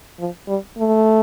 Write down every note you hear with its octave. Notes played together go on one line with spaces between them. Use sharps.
F3
G3
A3